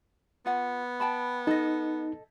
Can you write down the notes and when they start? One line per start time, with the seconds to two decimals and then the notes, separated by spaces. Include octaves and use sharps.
0.46 B3 F4 F#5
1.00 G5 A5 B5
1.47 D#4 A4 D#5